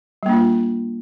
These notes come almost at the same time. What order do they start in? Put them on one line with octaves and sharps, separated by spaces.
G3 A#3 D4 F4